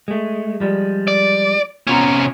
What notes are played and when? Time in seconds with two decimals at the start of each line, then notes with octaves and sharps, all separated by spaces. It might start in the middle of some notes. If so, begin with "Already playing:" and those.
0.08 G#3 A3
0.60 F3 G3 G#3
1.08 D5
1.87 C3 B3 C#4 F4 A#5